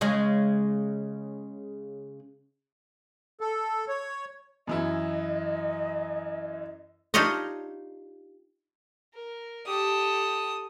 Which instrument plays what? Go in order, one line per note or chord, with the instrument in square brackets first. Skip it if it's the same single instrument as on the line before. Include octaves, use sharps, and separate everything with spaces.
[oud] C#3 G#3 C#4
[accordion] A4
C#5
[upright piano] F#2 E3 E4 [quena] D#5
[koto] D4 D#4 F4 G4 C#5 D#5
[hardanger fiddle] A#4
[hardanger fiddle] G4 A4 [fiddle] D#6